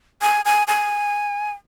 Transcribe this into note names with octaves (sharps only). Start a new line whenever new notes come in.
G#5
G#5
G#5